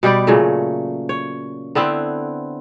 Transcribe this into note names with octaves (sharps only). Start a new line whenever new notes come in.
B2 G3 G4 D5
A#2 C#3 F#3 A3
C#5
D3 B3 C4 E4